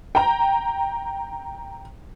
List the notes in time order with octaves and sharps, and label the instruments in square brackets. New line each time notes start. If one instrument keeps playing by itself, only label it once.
[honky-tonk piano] G5 A#5